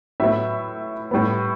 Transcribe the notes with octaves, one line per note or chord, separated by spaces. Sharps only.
A2 F#3 B3 E5
A2 G3 B3